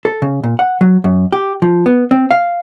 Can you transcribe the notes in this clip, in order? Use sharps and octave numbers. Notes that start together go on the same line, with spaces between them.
A4
C#3
A#2
F#5
F#3
F#2
G4
F3
B3
C4
F5